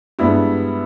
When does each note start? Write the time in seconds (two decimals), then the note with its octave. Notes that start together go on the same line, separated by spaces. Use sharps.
0.19 G2 G3 G#3 B3 E4